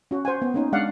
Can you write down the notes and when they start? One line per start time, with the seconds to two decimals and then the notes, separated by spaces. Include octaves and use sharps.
0.11 C#4 F#4
0.25 C5 F#5 G#5
0.42 B3
0.54 A#3 C#4 D#4
0.72 G#3 D4 D5 F5 F#5